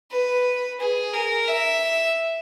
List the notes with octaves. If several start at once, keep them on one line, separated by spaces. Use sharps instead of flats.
B4
G#4
A#4
E5